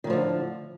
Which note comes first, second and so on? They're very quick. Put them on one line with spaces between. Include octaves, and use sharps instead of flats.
D#3 A2 F3 D3